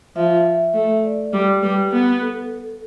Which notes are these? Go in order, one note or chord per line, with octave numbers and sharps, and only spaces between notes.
F3 E5
A3
D5
G3
G3 B4
B3
A4